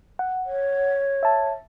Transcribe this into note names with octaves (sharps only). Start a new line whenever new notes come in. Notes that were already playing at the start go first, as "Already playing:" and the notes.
F#5
C#5
E5 A5